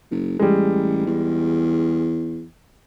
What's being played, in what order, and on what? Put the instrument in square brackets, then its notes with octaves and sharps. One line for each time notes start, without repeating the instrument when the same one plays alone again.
[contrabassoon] F#1
[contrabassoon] A1 [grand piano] G3 G#3
[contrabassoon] E2